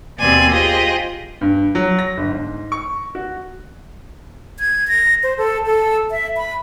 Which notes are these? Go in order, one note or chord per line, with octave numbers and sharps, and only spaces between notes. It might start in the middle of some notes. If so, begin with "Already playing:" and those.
D#2 B2 C4 D5 G#5 C6
F4 G4 G#4 C5 D#5
G2
F#3
A#6
G1
G#2
C#6
F#4
G#6
A#6
C5
A4
A4
E5
B5